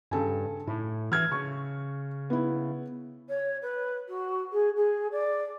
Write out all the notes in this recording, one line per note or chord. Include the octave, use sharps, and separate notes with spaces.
G2 C#3 A4 G#5
A2 E4
E3 F6 G#6
C#3 C#6
B3 E4
C#5
B4
F#4
G#4
G#4
D5